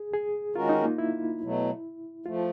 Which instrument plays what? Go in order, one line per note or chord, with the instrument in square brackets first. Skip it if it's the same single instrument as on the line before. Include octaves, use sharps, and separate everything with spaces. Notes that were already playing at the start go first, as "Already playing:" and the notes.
Already playing: [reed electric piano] G#4
G#4
[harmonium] D#3 G#3 C#4 F#4 A#4 [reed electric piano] F4
[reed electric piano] D#4
A#3
E4
[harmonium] B2 F#3 A3
[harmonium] F3 A3 [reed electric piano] F4